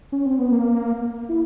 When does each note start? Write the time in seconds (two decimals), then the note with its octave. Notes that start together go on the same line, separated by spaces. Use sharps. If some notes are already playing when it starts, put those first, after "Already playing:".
0.12 C#4
0.26 C4
0.39 B3
0.52 A#3
1.29 E4